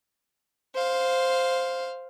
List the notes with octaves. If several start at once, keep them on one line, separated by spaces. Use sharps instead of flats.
C5 F5